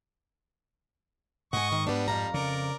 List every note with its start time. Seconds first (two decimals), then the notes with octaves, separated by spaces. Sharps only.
1.53 G#2 D#5 F#5 G#5 C#6
1.72 D#3
1.87 G3 B3 D4
2.08 F2 F5 A#5
2.34 C#3 A#4 D5